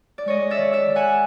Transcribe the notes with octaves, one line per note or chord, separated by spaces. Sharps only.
D5
G#3 C#5 D#5
D5 E5
D#3
D5 E5
D#3
F#5 G#5